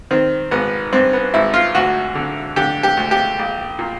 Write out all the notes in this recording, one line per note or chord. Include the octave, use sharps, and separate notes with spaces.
D#3 C4
G#1 B3
G2 C4
B3
G#1 E4
F4
D2 F#4
D3
D3 G4
G4
D2
G4
A#1
A#2